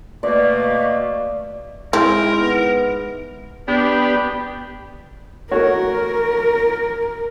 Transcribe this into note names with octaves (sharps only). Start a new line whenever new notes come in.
B2 A3 A#3 D5
G#2 C4 E4 A#4
B3
B3 D4 G4
A3 F#4 A#4 C#5